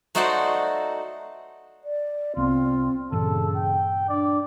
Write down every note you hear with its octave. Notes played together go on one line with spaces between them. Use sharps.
A3 D#4 F#4 C5 D5 F#5
D5
C2 B3 C4 F4
G2 A#2 C#3 E3 A4
G5
D4 D5